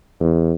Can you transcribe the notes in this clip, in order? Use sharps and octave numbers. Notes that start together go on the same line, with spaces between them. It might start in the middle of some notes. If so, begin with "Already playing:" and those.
E2